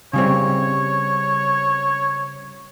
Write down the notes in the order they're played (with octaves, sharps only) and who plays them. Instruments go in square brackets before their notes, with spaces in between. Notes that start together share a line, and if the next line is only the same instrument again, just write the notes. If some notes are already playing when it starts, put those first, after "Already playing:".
[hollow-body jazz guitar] C#3 G3 C4 [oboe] C#5